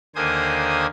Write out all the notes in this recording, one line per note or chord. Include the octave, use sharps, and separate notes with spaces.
D#2 D3 A#3 C5 G#5 D#6